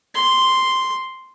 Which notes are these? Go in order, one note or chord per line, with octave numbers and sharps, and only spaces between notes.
C6